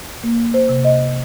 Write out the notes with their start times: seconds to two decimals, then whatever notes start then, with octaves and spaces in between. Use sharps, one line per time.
0.24 A#3
0.54 C5
0.69 C3
0.84 D#5